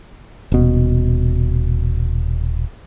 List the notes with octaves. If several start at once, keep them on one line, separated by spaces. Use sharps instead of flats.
D#1 B2